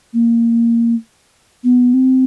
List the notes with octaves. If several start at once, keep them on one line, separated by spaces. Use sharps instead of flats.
A#3
B3
C4